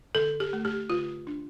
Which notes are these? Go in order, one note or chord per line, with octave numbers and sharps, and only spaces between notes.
D3 A4
G4
A3
G4
D3 F4
D4